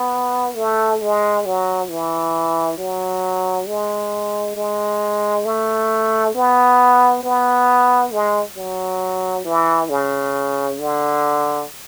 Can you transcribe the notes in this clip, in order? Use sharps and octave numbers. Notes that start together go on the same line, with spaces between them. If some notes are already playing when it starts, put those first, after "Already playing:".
Already playing: B3
A3
G#3
F#3
E3
F#3
G#3
G#3
A3
B3
B3
G#3
F#3
E3
C#3
D3